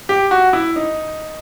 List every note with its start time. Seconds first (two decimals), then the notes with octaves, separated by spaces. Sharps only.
0.09 G4
0.31 F#4
0.53 E4
0.76 D#4